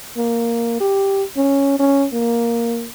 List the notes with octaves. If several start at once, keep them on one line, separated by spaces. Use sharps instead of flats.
A#3
G4
C#4
C#4
A#3